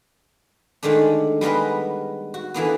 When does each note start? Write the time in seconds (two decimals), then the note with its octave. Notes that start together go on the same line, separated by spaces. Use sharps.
0.83 D3 D#3 G#3 A3 D4
1.41 G3 G#3 B3 A#4 B4
2.34 F#4
2.54 D3 E3 A#3 B3